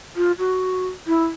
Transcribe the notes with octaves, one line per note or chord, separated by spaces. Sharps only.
F4
F#4
E4